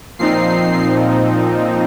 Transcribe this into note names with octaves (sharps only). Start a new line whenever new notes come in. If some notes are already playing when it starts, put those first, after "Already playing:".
A#2 F3 C4 D#4 C7